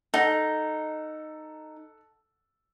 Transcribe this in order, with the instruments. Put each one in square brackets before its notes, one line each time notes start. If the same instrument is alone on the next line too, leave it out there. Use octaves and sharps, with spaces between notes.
[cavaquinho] D#4 [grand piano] A4 F#5 A5